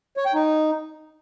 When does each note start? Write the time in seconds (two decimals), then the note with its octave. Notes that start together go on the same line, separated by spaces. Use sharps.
0.17 C#5
0.26 G5
0.34 D#4